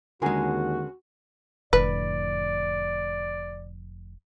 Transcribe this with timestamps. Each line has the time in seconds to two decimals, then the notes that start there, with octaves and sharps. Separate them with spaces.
0.22 D#2 D3 G#3 C#4 F#4 G#4 A#4
1.73 F1 F2 A2 D3 B4 D5